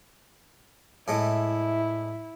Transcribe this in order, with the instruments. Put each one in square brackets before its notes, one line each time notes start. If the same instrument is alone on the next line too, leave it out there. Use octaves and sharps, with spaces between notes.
[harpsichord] A2 G#3 A3 [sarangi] E4